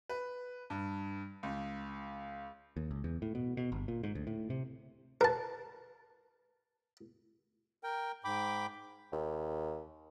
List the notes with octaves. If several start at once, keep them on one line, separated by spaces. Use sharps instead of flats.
B4
G2
C#2
D#2
C#2
E2
A2
B2
B2
G1
A#2
G#2
D2
A2
C3
A#4 B4 A5
A#4 G5
G#2 G5 B5 D6
D#2